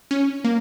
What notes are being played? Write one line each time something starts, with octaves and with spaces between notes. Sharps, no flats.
C#4
A#3